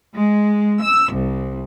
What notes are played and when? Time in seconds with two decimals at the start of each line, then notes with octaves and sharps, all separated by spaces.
0.16 G#3
0.84 E6
1.15 C2